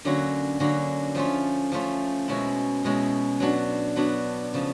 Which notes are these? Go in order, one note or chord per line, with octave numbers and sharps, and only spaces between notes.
D3 F#3 A#3 C#4 F#4
D3 F#3 A#3 C#4 F#4
F3 A3 C#4 F4
F3 A3 C#4 F4
B2 G#3 C#4 E4
B2 G#3 C#4 E4
F#3 B3 D4 F#4
F#3 B3 D4 F#4
C#3 F3